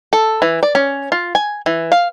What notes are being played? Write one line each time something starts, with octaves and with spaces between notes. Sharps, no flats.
A4
E3
D5
C#4
F4
G#5
E3
F5